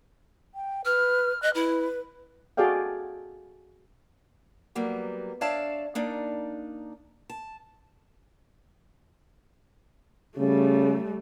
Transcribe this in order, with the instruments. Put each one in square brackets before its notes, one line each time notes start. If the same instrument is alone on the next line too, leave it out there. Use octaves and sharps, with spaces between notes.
[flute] G5
[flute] B4 [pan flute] F6
[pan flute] D#5 [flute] F#6
[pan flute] E4 [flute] B4
[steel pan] F#4 G#4 A4 D5 F5 G5
[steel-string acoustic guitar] F#3 G3 A#3 B3
D4 C#5 D5 E5 F5 A5
A#3 D4 D#4 D5
A5
[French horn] C#3 [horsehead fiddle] G3 A3